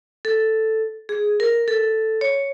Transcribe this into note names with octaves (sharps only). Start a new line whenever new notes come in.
A4
G#4
A#4
A4
C#5